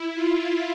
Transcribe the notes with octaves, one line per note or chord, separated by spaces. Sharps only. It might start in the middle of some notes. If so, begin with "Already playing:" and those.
Already playing: E4
F4